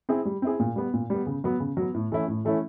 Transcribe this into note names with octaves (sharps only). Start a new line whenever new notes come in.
C4 E4 G#4
G3
C4 E4 G#4
A#2
G3 B3
A#2
G3 B3
C#3
F#3 B3
C#3
F#3 B3
A2
E3 A3 C#4 E4
A2
E3 A3 C#4 E4